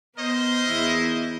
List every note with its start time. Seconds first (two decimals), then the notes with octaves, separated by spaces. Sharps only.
0.17 B3 A#4 C5 D#5
0.67 E2 E4